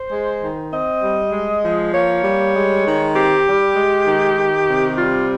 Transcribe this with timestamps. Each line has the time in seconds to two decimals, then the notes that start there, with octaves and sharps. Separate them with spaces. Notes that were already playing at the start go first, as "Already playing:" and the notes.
Already playing: C5
0.11 G#3
0.41 D#3
0.71 C4 D#5
1.02 G3
1.32 G#3
1.63 F3
1.92 A#3 C#5
2.23 G3
2.54 G#3
2.85 D#3
3.15 C4 G4
3.45 G3
3.75 G#3
4.06 D#3
4.37 D#3
4.68 C3
4.98 G3 F4